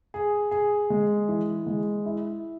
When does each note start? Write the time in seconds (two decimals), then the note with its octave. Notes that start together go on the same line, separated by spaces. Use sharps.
0.14 G#4
0.51 G#4
0.90 G#3
1.29 E3
1.67 G#3
2.05 E4